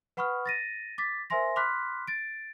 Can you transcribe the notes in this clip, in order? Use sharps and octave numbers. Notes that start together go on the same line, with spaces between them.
B4 F#5 B5 C#6 D#6 F6
A6 A#6 D#7
D6 A6 B6
A#4 C5 E5 G#5 C6 A#6
B5 C6 D6 F6 F#6 B6
A6 D7